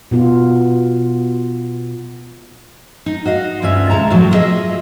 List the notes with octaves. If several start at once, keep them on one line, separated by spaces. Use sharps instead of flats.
B2 B3 F4
D#4
F#4 D#5 F5
D2 G2 C#4 F4 E5
D#2 C3 G#3 A5 A#5
A2 D#3 F3 F#3 A3
E4 F4 G#4 A#4 D#5 E5